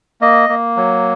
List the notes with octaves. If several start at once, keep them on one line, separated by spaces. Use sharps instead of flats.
A#3 D#5
A#3
F#3